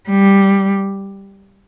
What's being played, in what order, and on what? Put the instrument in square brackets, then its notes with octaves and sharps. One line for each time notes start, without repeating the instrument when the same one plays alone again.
[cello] G3